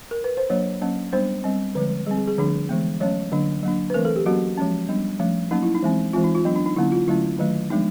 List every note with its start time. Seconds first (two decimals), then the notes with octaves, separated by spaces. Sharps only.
0.11 A#4
0.24 B4
0.37 C5
0.50 F#3 A#3 D4 C#5
0.82 F#3 A#3 C#4
1.13 G3 B3 D4 C5
1.44 G3 C4
1.75 D3 F3 G#3 B4
2.07 G3 G#4
2.11 C4
2.17 G#4
2.27 G#4
2.38 D3 F3 A3 D4 G#4
2.69 E3 G#3 B3
3.00 F#3 A3 C#4 C#5
3.32 D3 F#3 A#3 D4
3.63 F#3 A#3 D4
3.90 B4
3.94 E3 A3 C4 A#4
4.05 A4
4.16 G4
4.26 F#3 A#3 C#4 F#4
4.57 F3 G#3 C#4
4.89 G3 B3 D4
5.20 F3 A3 C#4
5.51 F#3 A#3 C#4 D#4
5.63 E4
5.75 D#4
5.83 E3 G#3 C4
6.13 E3 G#3 C4 F4
6.24 D#4
6.35 F4
6.45 F#3 B3 D4
6.56 D4
6.66 D#4
6.76 D3 F#3 A#3 C#4 E4
6.92 F4
7.07 D3 F#3 A3 C#4 E4
7.39 D#3 F#3 A3
7.70 F3 G#3 B3 D4 D#4